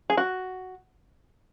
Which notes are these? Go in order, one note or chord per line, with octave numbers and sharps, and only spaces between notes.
G#4
F#4